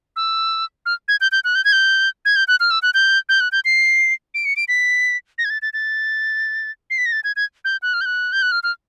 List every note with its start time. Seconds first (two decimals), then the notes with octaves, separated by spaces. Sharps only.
0.16 E6
0.86 F6
1.08 G#6
1.21 G6
1.32 G6
1.44 F#6
1.55 G6
1.65 G#6
1.72 G6
2.25 G#6
2.36 G6
2.48 F#6
2.60 F6
2.71 E6
2.82 F#6
2.94 G6
3.29 G6
3.40 F#6
3.52 G6
3.65 C7
4.34 D7
4.45 C#7
4.56 D7
4.68 B6
5.38 A#6
5.45 G#6
5.50 A6
5.62 A6
5.73 A6
6.90 C7
6.98 B6
7.06 A#6
7.12 A6
7.24 G#6
7.36 G#6
7.65 G6
7.82 F#6
7.94 F6
8.01 G6
8.06 F#6
8.32 G6
8.42 F#6
8.52 F6
8.63 F6